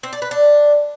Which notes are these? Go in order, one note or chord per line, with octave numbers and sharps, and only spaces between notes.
C4
D5
B4
D4